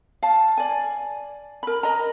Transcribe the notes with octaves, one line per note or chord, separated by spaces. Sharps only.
F5 A5
D5 G#5
A#4 B5
A#4 D#5 A#5